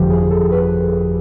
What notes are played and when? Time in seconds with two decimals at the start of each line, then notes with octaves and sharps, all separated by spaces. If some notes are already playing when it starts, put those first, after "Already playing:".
Already playing: G1 F2 D3 F3 G4
0.10 G#4
0.31 A4
0.52 B4